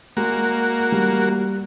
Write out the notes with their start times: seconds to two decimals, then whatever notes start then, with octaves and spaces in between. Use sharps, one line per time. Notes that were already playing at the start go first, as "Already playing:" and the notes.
0.17 G#3 A#3 F#4
0.92 G3